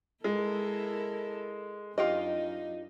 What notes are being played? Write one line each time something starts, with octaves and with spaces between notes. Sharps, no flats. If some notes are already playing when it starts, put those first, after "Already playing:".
G#3 E4 A4 A#4
F#2 D4 D#4 F4 G4 D#5